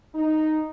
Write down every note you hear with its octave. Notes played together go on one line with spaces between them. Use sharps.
D#4